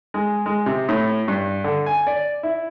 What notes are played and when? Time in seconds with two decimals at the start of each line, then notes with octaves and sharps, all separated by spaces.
0.14 G#3
0.46 G#3
0.66 C3
0.89 A2
1.28 G2
1.64 D3
1.86 G#5
2.07 D5
2.43 E4